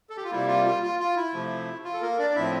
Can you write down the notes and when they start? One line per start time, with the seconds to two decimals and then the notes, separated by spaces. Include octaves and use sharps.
0.10 A4
0.17 G4
0.24 F4
0.31 C3 G3 A#3 E4
0.48 F4
0.66 F4
0.83 F4
1.00 F4
1.16 E4
1.33 C3 F3 A3
1.84 F4
1.94 A4
2.02 A#3 A#4
2.19 D4 D5
2.30 D5
2.36 A2 F3 C4 E4 E5